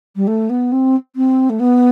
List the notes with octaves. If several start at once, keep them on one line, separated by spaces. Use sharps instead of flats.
G3
A3
B3
C4
C4
A3
B3